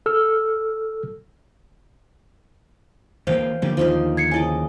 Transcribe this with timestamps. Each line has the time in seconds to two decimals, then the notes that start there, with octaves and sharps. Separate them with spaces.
0.06 A4 E6 F6
3.27 D2 E3 A#3 C5 F5 G5
3.62 D3 F3 A#3 G4
3.77 D#2 D3 F3 D#4 A#4
4.17 G#6 C7 C#7
4.31 C#3 E4 D#5 G#5 D6